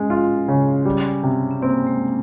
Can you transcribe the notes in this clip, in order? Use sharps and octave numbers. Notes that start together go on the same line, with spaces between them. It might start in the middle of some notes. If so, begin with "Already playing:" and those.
Already playing: G#3 C#4
F4
C#3
G3
C3
C4
A#3 C4
G#3